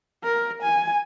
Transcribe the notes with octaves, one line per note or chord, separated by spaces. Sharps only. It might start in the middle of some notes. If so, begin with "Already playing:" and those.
A#4
G#5